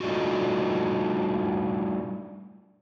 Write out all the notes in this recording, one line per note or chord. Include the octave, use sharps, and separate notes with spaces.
G3 A3 D4 D#4 F4 F#4